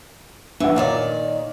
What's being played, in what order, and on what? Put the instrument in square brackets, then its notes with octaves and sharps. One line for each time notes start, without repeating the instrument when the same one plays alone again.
[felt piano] A#1 F#5 [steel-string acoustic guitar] E3
[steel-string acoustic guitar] A#2 D#3 D5 [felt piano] C#5 F5